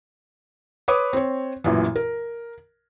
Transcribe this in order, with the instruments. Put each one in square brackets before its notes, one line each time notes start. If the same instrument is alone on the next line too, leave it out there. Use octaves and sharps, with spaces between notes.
[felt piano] B4 C#5 D6 D#6
C4 C#5
A1 F#2 A#2 E3
A#4